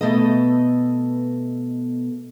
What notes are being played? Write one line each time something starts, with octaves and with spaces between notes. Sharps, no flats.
B2 E3 A3 B3 A4 D#5